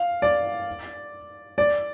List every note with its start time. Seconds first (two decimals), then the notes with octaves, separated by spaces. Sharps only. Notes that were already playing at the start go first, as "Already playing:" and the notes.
Already playing: F5
0.22 D5
1.58 D5